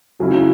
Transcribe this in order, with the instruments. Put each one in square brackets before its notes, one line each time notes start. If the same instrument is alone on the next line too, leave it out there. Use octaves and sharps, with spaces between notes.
[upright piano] C#3 F#3 C#4 E4